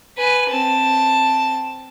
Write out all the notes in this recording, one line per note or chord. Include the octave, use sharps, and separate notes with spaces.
B4 G#5
C4 A5